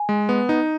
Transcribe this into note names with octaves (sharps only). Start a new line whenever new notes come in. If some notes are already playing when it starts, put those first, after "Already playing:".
Already playing: G#5
G#3
B3
D#4